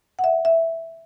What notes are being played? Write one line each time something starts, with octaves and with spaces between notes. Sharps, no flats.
F#5
E5
E5